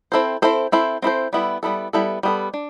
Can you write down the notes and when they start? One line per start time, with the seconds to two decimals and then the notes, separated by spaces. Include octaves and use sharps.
0.12 C4 E4 A4 C5
0.42 C4 E4 A4 C5
0.72 C4 E4 A4 C5
1.02 C4 E4 A4 C5
1.33 G3 B3 E4 A4
1.63 G3 B3 E4 A4
1.93 G3 B3 E4 A4
2.23 G3 B3 E4 A4
2.54 D4